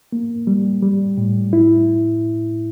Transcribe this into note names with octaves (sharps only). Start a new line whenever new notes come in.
A#3
G3
G3
A2
E4